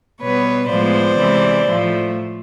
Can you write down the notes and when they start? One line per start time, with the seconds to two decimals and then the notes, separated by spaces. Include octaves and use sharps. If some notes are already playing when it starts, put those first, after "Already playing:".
0.21 B2 G3 B3 B4 C#5
0.69 A2 F3 G#3 B3 C5 D5
1.18 C3 E3 G#3
1.66 A2 F3 A3